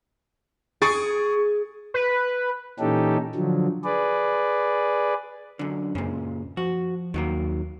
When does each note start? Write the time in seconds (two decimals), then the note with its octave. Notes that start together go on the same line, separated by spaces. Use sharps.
0.82 G#4 C#6 A6 D7
1.94 B4
2.80 A#2 E3 C#4 D#4 G4 A4
3.35 D3 F3 F#3
3.84 G#4 B4 D5
5.59 F#2 D3
5.95 F#2 A#2 C#3
6.57 F3 F#4
7.14 D#2 D#3 F#3 A#3